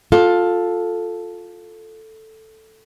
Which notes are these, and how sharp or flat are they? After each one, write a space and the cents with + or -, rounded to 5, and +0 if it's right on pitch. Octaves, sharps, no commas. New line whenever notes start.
F4 +15 A4 +0